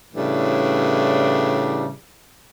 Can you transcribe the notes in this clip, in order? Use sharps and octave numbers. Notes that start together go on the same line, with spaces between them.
A2 C#3 E3 G3 D4